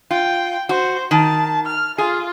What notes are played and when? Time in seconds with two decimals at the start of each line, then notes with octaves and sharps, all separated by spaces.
0.11 F4 G5
0.69 F#4 C5
1.11 D#3 A5
1.67 F6
1.98 F4 G#4